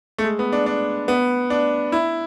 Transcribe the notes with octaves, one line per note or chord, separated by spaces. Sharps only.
A3
G#3
B3
D4
D4
B3
D4
E4